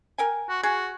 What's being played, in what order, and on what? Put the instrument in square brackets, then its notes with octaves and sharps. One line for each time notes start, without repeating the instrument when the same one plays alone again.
[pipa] A#4 G5 G#5
[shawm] F#4
[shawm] F#4 [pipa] G#4